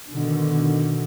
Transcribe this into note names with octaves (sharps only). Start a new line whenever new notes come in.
B2 D3 D#3